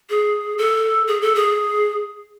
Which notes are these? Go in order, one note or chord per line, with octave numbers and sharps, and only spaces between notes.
G#4
A4
G#4
A4
G#4